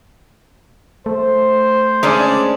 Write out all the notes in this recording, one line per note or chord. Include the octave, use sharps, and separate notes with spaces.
A3 C5
G#3 C#4 D4 D5